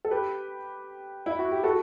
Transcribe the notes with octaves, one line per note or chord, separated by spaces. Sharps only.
A4
G4 B4
E4
F#4
G4
F#4 A4